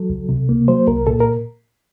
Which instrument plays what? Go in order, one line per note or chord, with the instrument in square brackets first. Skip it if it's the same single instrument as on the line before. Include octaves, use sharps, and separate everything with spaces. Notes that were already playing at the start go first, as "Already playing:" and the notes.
Already playing: [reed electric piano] F#3 A4
C#2
C3
A#3
F#3 C5
C2 A#4
A#2 A4
A#4